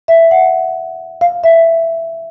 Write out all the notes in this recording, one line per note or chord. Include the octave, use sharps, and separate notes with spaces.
E5
F#5
F5
E5